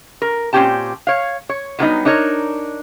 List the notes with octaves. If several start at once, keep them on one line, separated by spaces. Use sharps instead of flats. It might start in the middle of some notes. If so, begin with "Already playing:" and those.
A#4
A#2 C4 C#4 G4 G5 A5
C#5 F5
C#5
A2 D3 F#3 G3 B3 D#4
D4 D#4 A#4 C#5